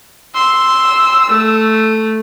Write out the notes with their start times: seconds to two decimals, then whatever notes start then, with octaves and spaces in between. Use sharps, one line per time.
0.35 C6 E6
1.29 A3